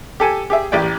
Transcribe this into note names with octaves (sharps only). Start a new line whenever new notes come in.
G4 A4 G#5
G4 G#4 E5
A1 G4 D5 G5